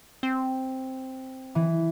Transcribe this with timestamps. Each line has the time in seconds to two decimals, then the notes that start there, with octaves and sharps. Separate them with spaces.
0.23 C4
1.55 E3